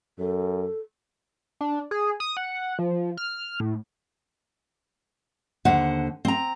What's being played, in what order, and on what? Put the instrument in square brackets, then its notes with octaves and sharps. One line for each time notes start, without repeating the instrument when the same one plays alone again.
[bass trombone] F#2 [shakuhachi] A4
[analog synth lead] D4
G#4
D#6
F#5
F3
F6
A2
[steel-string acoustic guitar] D#2 D3 C5 F#5
C4 A#5